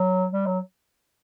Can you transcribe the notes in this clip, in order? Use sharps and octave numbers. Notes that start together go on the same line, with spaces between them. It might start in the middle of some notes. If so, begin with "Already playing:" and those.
Already playing: F#3
G3
F#3